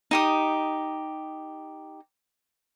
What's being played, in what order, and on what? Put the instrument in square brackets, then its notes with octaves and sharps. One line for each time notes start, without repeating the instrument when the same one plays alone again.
[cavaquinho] D#4 G4 D#6